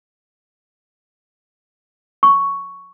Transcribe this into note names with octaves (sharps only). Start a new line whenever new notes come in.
C#6